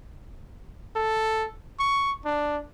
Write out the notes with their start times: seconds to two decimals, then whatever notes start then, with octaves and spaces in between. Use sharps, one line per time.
0.96 A4
1.79 C#6
2.25 D4